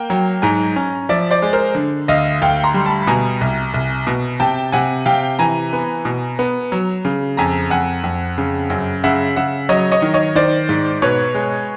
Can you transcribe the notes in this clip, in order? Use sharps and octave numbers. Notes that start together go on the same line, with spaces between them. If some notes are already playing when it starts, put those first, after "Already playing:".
Already playing: A#3 G5
F#3
G#2 G#5 A#5
C#4
F3 D5 E5
C5 D5
G#3
A#4 C5
D3
D2 D#5 F5
D2 F5 G5
A#5 C6
G3
A5 B5
B5
B2 G#5 A#5
C2
C2
B2
C3 G5 A5
C3 F#5 G#5
C3 F5 G5
E3 G#5 A#5
B3
B2
B3
F#3
C#3
F2 G#5 A#5
F2 F#5 G#5
F2
C#3
F#2
C#3 E5 F#5
C#3 E5 F#5
F#3 C#5 D#5
C#5 D#5
D#3
C#5 D#5
D#3 C5 D5
G#2
B2 B4 C#5
G#3